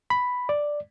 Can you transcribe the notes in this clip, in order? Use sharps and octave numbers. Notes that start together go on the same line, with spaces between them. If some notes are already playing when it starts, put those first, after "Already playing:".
B5
D5